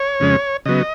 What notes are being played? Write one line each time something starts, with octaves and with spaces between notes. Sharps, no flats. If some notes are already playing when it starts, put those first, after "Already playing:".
Already playing: C#5
F2 C#3 G#3 C#4
C#3 F#3 B3 D#5